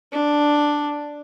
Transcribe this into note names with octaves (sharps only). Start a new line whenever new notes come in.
D4